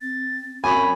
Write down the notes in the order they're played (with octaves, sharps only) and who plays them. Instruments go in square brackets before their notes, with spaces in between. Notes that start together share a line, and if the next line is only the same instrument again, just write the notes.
[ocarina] C4 [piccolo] A6
[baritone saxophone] F#2 [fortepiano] G#5 [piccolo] B5